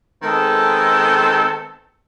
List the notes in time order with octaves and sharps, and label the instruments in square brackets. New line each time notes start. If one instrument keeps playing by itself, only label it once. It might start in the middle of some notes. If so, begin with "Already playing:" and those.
[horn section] D#3 G#3 B3 C4 A4